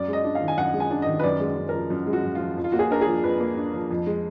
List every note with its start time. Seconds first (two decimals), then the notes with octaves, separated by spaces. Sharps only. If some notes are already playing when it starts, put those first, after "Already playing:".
Already playing: F#2 D5
0.08 G#3 D#5
0.24 D4
0.35 F5
0.41 D#3
0.48 G#5
0.58 F#2 F#5
0.74 G#3
0.80 G#5
0.91 D4
1.02 D#3 D#5
1.19 B4
1.23 F#2 D5
1.40 G#3
1.57 F#2
1.69 F3 A#4
1.90 F#2
2.07 G#3
2.13 F#4
2.23 F#2
2.35 F3 F4
2.57 F2
2.64 F4
2.72 A#3 F#4
2.79 G#4
2.91 D4 A#4
3.01 G#4
3.07 F3
3.23 F2 B4
3.40 A#3
3.57 D4
3.74 F3
3.91 F2
4.07 G#3